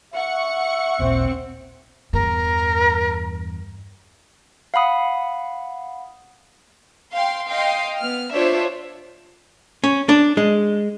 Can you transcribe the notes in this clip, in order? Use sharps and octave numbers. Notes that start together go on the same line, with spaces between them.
E5 F#5 C#6 C#7
A1 D#2 A#2 C4
E2 G2 A#4
F5 F#5 B5 D#6
F5 G5 C6
D#5 F5 G5 C6
B3 F6
D4 F4 C5 C#5 E5
C#4
D4
G#3